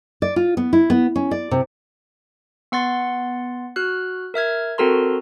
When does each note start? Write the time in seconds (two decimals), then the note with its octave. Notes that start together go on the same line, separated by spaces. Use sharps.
0.22 D5
0.36 F4
0.57 B3
0.73 E4
0.90 B3
1.16 C#4
1.31 D5
1.51 C3
2.72 B3 F#5 C6 A6
3.76 F#4 F6 F#6
4.34 A#4 E5 F6 G#6
4.78 C4 F#4 A4 A#4 A#5 C6